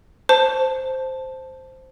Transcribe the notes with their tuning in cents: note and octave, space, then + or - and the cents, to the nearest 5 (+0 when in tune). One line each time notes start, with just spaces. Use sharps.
C5 +0 A5 +0